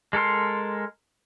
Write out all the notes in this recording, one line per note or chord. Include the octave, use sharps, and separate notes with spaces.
G#3 A4 A#4 C6